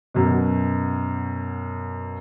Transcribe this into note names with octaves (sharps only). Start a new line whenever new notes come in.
F#2 B2